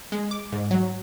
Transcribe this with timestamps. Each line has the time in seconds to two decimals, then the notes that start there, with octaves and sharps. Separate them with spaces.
0.12 G#3
0.31 D6
0.53 G#2
0.71 F#3